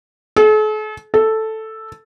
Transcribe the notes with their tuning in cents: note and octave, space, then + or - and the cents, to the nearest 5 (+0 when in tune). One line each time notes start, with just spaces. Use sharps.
A4 -45
A4 +0